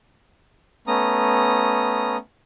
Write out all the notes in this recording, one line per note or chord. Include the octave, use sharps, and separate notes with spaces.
A3 B3 C#4 A#5 D#6